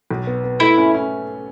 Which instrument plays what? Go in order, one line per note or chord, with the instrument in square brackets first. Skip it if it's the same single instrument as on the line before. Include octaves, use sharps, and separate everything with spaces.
[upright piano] B1
B3
B3
[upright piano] A3 [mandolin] E4
[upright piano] C#4
C#4